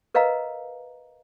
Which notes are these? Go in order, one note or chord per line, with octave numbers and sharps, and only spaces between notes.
A#4 B4 D#5 F5 A#5